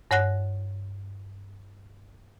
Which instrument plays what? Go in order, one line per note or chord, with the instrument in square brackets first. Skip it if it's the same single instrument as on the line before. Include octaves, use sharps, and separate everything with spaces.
[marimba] G2 C#5 F#5 F#6 A#6